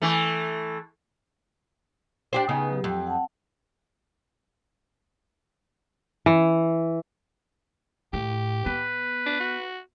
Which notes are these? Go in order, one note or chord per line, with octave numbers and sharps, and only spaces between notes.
E3 A3
D4 G4 C5
C#3 B3 D#4 G#5
F#3 G4
F2
F#5 A5
E3
A2 G4
B3 B4
D4
F#4